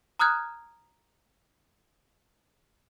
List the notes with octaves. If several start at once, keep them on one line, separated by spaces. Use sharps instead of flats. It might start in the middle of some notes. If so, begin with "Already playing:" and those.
A#5 D#6 F6 F#6 G#6